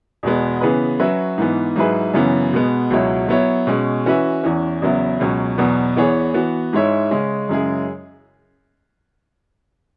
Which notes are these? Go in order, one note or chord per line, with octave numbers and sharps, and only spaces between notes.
E2 B2 G#3 B3
C#3 E3 B3 G#4 B4
F#3 C#4 F#4 B4 E5
G#2 E3 B3
G#2 F#3 E4 G#4 B4
F#2 C#3 E3 B3
B2 G#3 B3
C#2 B2 F#3 E4 C#5
F#3 B3 E4 C#5
B2 G#3 C#4
E3 C#4 F#4 B4 E5
E2 E3 C#4
E2 C#3 F#3 B3 E4
C#2 B2 F#3 C#4
E2 B2 F#3 B3
E2 E3 B3 G#4 C#5
E3 B3 F#4
G#2 G#3 E4 C#5 E5
C#3 G#3 C#4
F#2 C#3 G#3 E4 G#4